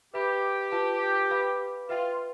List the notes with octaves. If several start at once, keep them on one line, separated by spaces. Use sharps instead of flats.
G4 B4 E5 B5 D6
F4 B4 F5 A5
B4 F5 B5 D6
F4 B4 E5 G5 C6